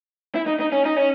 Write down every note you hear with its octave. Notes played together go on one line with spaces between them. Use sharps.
E4
D#4
D#4
C#4
D#4
C#4